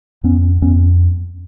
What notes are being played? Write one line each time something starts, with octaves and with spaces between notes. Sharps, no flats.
F2 B3 C#4
F2 B3 C#4